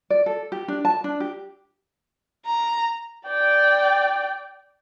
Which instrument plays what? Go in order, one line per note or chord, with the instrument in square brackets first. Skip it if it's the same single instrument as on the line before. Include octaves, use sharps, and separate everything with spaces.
[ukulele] D5
A4
G4
D4
A5
D4
G4
[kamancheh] A#5
D5 G5